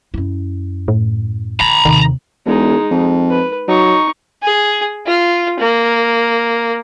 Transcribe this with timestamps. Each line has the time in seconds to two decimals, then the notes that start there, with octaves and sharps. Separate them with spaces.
0.14 F#2 E4
0.88 A2
1.61 D3 A#5 B5
1.85 D#2 C3 D#3
2.46 E1 G#3 D#4
2.91 F2
3.30 B4
3.68 F#3 D#4 C#6
4.43 G#4
5.07 F4
5.60 A#3